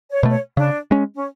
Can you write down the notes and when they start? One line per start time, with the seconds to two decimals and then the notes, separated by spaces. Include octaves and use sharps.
0.10 C#5
0.23 B2 A3
0.31 C#5
0.57 C#3 D4
0.91 G#3 C#4
1.15 C#4